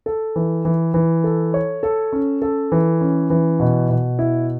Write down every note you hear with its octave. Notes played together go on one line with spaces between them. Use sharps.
A4
E3
E3
E3
A4
C#5
A4
C#4
A4
E3
C#4
E3
B2
B2
E4